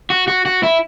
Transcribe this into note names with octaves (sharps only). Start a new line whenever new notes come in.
F#4
F#4
F#4
E4